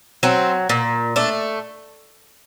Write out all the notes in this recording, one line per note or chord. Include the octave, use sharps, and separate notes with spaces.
F#3 C4
A#2
A3 D4